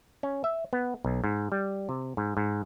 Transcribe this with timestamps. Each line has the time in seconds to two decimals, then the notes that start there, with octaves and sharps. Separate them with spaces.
0.23 C#4
0.44 E5
0.73 B3
1.05 B1
1.24 G#2
1.52 G3
1.89 C3
2.17 G#2
2.37 G#2